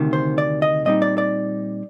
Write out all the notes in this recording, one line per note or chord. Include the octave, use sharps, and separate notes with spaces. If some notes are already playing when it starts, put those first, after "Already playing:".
Already playing: D2 C3 D#3
C5
D5
D#5
A#2 G3 C4 D#4 D#5
D5
D5